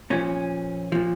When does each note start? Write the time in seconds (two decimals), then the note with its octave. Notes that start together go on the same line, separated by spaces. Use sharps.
0.10 A#2 F3 C#4
0.92 A#2 F3